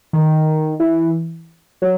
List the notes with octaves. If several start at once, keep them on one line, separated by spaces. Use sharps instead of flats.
D#3
E3
F#3